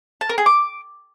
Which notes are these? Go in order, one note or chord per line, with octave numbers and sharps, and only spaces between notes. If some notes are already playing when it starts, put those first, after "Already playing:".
A5
A#4
G#4
D6